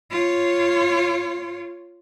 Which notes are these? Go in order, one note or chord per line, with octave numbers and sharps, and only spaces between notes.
F4 C#5